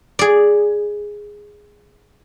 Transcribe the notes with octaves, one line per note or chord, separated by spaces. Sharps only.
G#4 D5